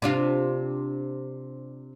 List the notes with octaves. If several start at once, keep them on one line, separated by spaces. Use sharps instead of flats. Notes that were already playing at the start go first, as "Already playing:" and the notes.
C3 D4 F4